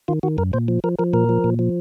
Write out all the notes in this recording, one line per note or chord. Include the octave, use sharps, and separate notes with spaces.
D#3 F4
D#3 F#4
F#2 A#4
A#2 C5
F3
F3 A#4
F3 A#4
A#2 A#4
F3
A#2
F3